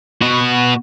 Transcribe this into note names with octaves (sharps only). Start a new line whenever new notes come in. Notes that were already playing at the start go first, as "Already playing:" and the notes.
B2 F#4